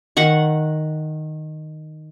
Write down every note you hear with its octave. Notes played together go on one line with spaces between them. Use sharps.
D#3 F#5 C#6